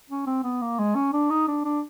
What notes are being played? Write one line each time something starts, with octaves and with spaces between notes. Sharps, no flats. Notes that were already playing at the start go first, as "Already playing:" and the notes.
C#4
C4
B3
A#3
G#3
C#4
D4
D#4
D4
D4